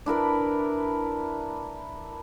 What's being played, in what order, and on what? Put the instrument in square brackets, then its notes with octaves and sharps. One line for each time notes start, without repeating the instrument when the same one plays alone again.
[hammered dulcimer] D4 E4 A#4 B4